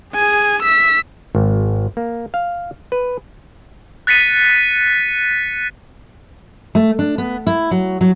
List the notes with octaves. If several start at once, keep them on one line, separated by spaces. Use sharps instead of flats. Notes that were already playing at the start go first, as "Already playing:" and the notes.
G#4 G#5
E6 B6
G#1
A#3
F5
B4
F#6 A6 B6 C#7 D#7
A3
D4
B3
E4
F#3
F#3